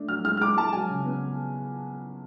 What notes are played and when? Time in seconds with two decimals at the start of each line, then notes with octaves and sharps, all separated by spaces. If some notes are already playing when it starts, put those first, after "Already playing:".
Already playing: A3 D4
0.08 F#3 F6
0.24 G#3 F6
0.37 F6
0.41 G#3 D6
0.57 G#3 A5
0.73 F#3 G#5
0.89 C#3
1.05 B3